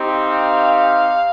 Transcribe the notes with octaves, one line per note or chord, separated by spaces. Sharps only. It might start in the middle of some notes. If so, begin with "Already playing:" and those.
Already playing: C4 D#4 G4
F5